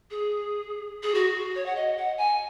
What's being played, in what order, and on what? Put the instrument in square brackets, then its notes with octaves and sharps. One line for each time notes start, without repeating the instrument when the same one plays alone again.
[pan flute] G#4
G#4
F#4
C#5
F#5
D#5
F#5
G#5